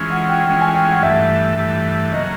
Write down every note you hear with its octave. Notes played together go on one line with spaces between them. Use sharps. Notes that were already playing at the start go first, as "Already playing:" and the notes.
Already playing: E3 G#3 C#4 F4
F#5
G5
E3 G#3 C#4 F4 G5
G#5
G5
F#5
G2 E3 A3 E5
G2 E3 A3
C#3 F#3 A#3 D#5